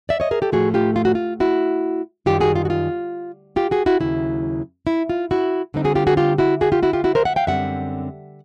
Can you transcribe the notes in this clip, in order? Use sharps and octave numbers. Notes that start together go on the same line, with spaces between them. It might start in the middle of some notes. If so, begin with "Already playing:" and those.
D5 E5
C#5 D#5
G#4 A#4
G4 A4
A2 F3 A3 F#4 G#4
F4 G4
F4
F#4
F4
E4 F#4
F#2 D#3 G3 F4 G4
F#4 G#4
F4
F#4
F4
F4 G4
F#4 G#4
E4 F#4
D#2 C#3 F#3 E4
E4
F4
E4 F#4
D3 G3 C4 D#4
F#4 G#4
F4 G4
F#4 G#4
F4 G4
E4 F#4
F#4 G#4
F4 G4
E4 F#4
F4 G4
E4 F#4
A#4 C5
E5 F#5
F5 G5
F#2 D3 G3 C4 E5 F#5